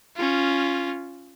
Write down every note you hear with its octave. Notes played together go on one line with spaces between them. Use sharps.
C#4 F4